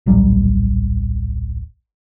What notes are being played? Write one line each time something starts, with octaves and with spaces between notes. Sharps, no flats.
D1 A#1 F#3 G3